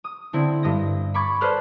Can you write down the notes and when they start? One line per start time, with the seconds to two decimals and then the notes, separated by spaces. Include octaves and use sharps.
0.04 D#6
0.33 D3 C4 E4
0.63 G2 D#5 A#6
1.14 B5 C#6 D6 G#6 A6
1.41 A4 B4 C5 D5 F6 F#6